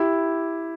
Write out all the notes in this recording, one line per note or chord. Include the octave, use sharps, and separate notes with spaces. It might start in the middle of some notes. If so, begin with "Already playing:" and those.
Already playing: E4 G4